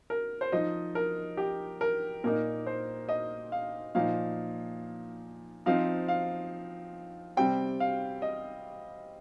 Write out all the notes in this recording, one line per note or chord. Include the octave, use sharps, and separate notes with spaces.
A#4
C5
F3 D#4 D#5
A#4
G4
A#4
A#2 A#3 D#4 A#4
C5
D#5
F5
A#2 F3 D#4 F5
F3 C4 D#4 F5
F5
C3 G3 C4 G5
F5
D#5